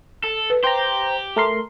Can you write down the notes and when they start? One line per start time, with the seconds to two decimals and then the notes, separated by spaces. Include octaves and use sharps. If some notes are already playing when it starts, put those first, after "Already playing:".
0.24 A4
0.50 B4
0.64 G4 C5 G5 A#5
1.36 A3 A#4 C6